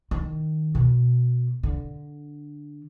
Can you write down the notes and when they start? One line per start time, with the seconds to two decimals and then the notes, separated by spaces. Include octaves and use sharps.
0.11 D#3
0.75 B2
1.63 D3